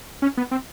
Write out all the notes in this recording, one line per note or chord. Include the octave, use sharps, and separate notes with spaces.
C#4
B3
C4